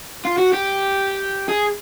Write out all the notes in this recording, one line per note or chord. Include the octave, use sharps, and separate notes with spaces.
F4
F#4
G4
G#4